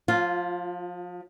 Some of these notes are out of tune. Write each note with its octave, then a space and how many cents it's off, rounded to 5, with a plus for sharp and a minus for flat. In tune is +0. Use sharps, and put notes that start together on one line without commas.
F3 +30 F4 +0